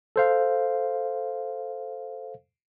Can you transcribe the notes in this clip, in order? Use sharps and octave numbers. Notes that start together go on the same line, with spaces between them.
A4 C5 F5